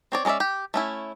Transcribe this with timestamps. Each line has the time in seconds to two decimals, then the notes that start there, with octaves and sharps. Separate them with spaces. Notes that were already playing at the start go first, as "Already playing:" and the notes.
0.12 C4 C#5 D5
0.25 G#3 C#4 A4 D5 E5
0.40 G4
0.74 A3 C#4 E4